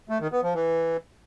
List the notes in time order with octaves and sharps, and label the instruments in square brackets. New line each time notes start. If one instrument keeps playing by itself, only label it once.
[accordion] A3
D#3
B3
F3
E3